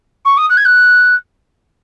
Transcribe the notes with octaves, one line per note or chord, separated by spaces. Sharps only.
C#6
D#6
F#6
G#6
F#6